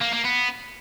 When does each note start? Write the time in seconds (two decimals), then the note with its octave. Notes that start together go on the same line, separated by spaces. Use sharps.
0.02 A#3
0.13 A#3
0.25 B3